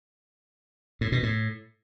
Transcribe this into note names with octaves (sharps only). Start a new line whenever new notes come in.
A2
B2
A2